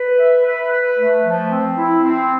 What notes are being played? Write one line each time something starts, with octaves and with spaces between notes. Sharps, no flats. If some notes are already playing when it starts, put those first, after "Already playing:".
Already playing: B4
E5
B4
B4
A3
F3
C4
E4
C4